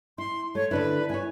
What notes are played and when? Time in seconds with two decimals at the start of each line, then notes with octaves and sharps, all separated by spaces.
0.18 E4 C6
0.55 A3 C#5
0.71 D3 D4 E4 B4
1.10 E4 C#5 G#5